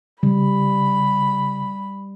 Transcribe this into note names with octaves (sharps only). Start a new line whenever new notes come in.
C#3 G3 B5